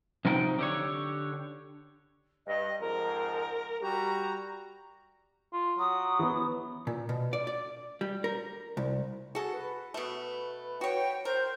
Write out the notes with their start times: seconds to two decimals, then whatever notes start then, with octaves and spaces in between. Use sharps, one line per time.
0.25 C3 F3 F#3 D#4 G5
0.59 D3 G4 C#5
2.47 G2 D#5
2.80 F2 G#2 A#4
3.82 G3 F#4 G4 A#5
5.53 F4
5.79 F#3 D#6
6.19 E3 B3
6.87 A#2
7.09 B2
7.33 D5
7.47 D5
8.01 G3
8.24 A#4
8.77 C2
9.35 F#4 G#4 A4
9.53 B4
9.94 B2 A3
10.81 F#4 C#5 G5
11.25 A#4 C5